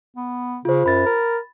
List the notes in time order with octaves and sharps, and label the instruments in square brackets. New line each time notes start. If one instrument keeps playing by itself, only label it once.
[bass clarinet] B3
[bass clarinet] C#3 [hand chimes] F4 C5
[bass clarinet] F#2 [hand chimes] B5 A6
[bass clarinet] A#4